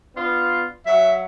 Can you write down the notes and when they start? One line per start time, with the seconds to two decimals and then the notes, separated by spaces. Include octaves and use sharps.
0.15 B3 D4 F4
0.86 F#3 E5